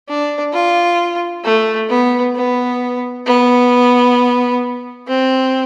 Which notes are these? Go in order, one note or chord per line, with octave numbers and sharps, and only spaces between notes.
D4
F4
A3
B3
B3
B3
C4